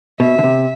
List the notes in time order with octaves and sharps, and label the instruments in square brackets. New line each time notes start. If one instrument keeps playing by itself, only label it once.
[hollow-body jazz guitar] B2 [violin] E5
[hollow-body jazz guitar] D3
C3